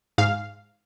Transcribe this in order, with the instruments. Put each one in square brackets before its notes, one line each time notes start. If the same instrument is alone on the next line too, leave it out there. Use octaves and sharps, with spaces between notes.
[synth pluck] G#2 F5